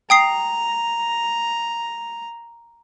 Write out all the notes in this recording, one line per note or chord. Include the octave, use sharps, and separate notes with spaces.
G5 A#5 D#6 C7